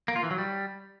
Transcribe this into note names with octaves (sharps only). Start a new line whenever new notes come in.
A#3
F4
E3
F#3
G3